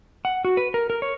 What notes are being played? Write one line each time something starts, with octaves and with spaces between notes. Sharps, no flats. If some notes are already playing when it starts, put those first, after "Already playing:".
F#5
F#4
B4
A#4
A#4
C#5